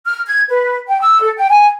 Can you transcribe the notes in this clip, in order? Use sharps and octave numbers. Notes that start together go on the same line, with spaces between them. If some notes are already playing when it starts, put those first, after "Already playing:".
F6
G#6
B4
G5
E6
A4
G5
G#5